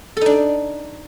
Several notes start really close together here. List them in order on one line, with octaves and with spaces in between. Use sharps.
A4 D#4 D4